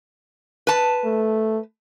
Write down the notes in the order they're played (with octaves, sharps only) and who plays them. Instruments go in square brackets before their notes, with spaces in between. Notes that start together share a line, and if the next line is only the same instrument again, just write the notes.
[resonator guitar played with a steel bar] B4 A5
[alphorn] A3